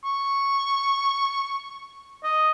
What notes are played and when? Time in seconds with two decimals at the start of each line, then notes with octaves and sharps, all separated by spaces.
0.04 C#6
2.24 D#5